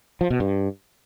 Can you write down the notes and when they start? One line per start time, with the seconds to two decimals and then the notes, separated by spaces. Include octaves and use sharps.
0.21 F3
0.30 B2
0.40 G2